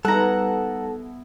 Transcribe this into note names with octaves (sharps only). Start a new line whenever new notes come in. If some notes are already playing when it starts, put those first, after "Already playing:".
G3 B3 D#4 E4 A4 F#5 A#5